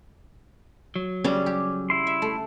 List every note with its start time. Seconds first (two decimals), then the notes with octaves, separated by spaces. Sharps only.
0.96 F#3
1.24 C#3 G3 C#4 D5
1.46 G4
1.90 E4 C6
2.07 E5
2.22 A3